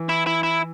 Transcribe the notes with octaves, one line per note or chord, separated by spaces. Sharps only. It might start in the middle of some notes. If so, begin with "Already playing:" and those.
Already playing: E3
E4
E4
E4